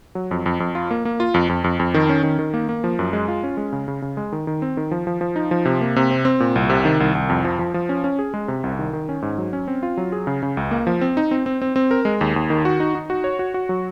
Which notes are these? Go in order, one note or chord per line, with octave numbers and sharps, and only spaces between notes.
F#3
F2
F2
F2
F4
A#3
A#3
F4
F2
F2
F2
F2
D#3
C#4
D#3
D#3
A#3
A#3
F3
F#2
G#3
F4
C#4
G#3
C#3
C#3
C#3
G#3
D#3
D#3
C4
D#3
F3
F3
F3
D#4
F3
C3
A#3
C3
C4
C4
A#2
C2
C3
D#3
C2
C2
F2
F3
F3
F3
C#4
C#4
G#4
G#3
C3
C2
D#3
D#3
C#4
G#2
F#3
C#4
C4
F4
F#3
G#4
C#3
C#3
C#2
A#3
F3
C4
D#4
C4
C4
C4
C4
A#4
G#3
D#2
D#2
D#3
F#4
D#4
D#4
F#4
C#5
F#4
F#4
F#3